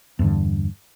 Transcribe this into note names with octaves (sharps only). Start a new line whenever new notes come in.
E2 G2 D3